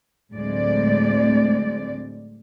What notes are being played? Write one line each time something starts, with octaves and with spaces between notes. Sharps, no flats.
D2 A2 F#3 G#3 C4 D5